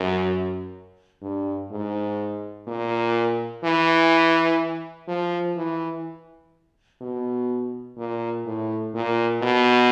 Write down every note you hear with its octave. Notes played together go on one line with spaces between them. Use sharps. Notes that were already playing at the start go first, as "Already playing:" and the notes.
Already playing: F#2
G2
G#2
A#2
E3
F3
E3
B2
A#2
A2
A#2
B2